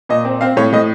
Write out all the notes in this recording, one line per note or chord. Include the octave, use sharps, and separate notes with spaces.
A#2 D#5
C4
C4 F5
A2 C#5
A2 D#5